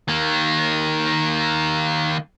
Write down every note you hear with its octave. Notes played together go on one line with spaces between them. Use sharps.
D#3 A#3